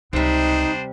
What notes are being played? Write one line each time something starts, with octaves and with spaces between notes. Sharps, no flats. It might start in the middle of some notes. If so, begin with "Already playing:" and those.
C#2 C3 G3 B3 D4 D#4 C5